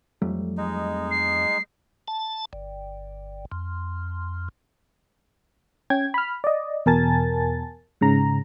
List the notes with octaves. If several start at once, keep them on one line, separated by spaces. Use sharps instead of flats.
F2 F#3 G3 A3
G#3 D#4
C7
A5
G1
F2
C#4 G5 G#6
B5 F6
D5 D#5
E2 B2 A#4 G#5 A5 A6
G#2 C#3 A#5